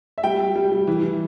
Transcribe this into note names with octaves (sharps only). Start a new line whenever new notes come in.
E5
G3 G5
G3
G3
G3
E3
E3